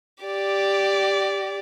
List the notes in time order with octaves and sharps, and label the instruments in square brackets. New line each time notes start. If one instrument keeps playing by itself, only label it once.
[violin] G4 D5